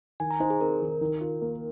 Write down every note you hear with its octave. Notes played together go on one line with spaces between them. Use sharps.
D#3 G#5
A#5
D#4 C5
G#4
C4 A#4
D#3
D#3
F4
A#3